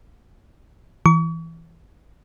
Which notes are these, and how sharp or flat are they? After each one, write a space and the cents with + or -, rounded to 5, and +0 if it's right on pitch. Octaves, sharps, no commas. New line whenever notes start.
E3 +0 C#6 +40